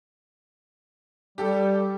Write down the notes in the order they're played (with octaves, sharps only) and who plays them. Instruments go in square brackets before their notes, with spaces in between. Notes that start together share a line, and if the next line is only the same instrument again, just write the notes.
[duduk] G3 [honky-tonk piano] G4 A4